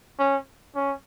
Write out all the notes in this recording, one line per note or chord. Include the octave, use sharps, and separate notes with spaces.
C#4
C#4